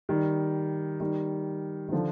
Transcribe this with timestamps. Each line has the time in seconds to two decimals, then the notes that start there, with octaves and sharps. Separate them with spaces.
0.09 D#3 G3
1.00 D#3 G3
1.88 D#3
1.92 D3 F3